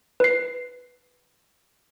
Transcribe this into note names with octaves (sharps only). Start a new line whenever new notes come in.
B4 C7